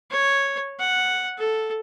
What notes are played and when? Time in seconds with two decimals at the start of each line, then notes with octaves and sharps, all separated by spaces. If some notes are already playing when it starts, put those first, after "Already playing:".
0.11 C#5
0.80 F#5
1.39 A4